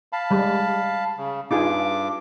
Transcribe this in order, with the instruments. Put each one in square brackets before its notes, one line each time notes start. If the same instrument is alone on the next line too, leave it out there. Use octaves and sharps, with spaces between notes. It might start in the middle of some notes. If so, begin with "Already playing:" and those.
[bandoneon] F5 A5 B5
[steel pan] G3 G#3
[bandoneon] C#3
[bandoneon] G2 D6 [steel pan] D#4 F4 G#4